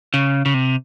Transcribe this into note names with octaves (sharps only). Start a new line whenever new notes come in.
C#3
C#3
C3